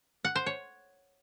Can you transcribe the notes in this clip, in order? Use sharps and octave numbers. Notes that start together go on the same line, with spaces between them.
F#5
C5
C#5